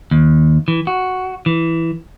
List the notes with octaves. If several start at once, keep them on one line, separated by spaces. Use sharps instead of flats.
D#2
E3
F#4
E3